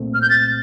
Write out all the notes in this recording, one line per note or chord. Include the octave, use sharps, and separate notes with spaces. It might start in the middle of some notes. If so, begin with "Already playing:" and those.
Already playing: C2 A#2 A3 C4
F6
G6
A6